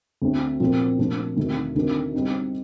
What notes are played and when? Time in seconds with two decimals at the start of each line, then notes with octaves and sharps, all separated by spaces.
0.22 D2 D3 A3 C4
0.60 A#2 F3 C4 F4
0.99 A#2 F3 A3 D4
1.37 D2 C3 D#3 A3
1.76 D2 C3 D#3 A#3 D4
2.14 D3 G3 C4 D#4